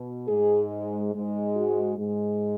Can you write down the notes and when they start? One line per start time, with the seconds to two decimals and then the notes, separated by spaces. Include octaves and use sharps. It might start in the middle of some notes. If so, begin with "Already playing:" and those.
Already playing: B2
0.27 G#2 G#3 G#4
1.12 G#2 G#3
1.55 F#4
1.97 G#2 G#3